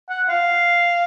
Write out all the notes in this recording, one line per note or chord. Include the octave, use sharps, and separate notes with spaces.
F#5
F5